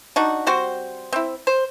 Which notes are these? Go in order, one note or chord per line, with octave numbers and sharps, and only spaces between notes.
D4 D#4 F#4
G3 C4 F#4 C5
C4 E4
C5